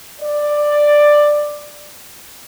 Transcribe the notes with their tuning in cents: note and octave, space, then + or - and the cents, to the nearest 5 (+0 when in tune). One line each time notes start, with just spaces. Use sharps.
D5 +10